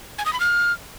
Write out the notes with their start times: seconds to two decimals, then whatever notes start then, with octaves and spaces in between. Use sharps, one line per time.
0.18 G#5
0.26 D#6
0.33 B5
0.40 F6